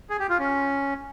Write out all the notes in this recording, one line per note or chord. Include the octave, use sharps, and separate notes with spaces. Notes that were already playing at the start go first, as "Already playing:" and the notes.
G#4
G4
F4
C#4